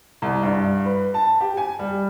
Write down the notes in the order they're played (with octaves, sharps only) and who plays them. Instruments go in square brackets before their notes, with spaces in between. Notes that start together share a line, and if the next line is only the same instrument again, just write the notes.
[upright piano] C2
G2
B4
A5
G4
G#5
G3